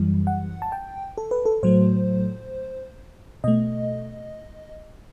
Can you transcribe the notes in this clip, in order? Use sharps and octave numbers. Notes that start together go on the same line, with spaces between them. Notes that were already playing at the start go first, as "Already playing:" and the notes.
Already playing: F#2 E3 G3
F#5
A5
G5
A4
B4
A4
A2 F#3 A3 C5
B2 A3 D#5